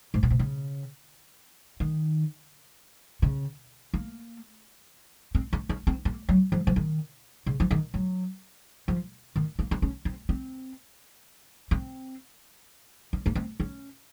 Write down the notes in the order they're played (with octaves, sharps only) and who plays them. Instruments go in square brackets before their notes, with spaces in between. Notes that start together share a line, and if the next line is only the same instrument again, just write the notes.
[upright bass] G#2
A#2
C3
C#3
D#3
C#3
A#3
C4
C#4
C#4
C4
A#3
F#3
F3
F3
D#3
C#3
F3
D#3
F#3
F3
D#3
A#3
C4
C#4
C4
C4
C4
C#4
A#3
C4
C#4